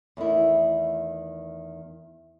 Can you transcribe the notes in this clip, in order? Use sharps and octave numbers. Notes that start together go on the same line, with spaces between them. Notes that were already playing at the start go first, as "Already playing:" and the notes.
E2 D#3 A3 E4